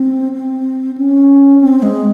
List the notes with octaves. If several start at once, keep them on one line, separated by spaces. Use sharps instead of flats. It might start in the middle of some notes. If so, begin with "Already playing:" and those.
Already playing: C4
C4
C#4
C4
G#3